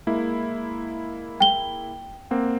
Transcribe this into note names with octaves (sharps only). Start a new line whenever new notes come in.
G#3 A#3 E4
G5 G7
A#3 C4 F#5